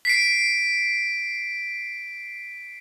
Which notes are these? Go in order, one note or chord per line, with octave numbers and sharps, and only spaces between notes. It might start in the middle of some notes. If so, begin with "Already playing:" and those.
B6 C7 D7